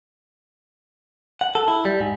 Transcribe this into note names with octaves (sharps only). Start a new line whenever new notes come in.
F#5
A4
E4
G3
G#2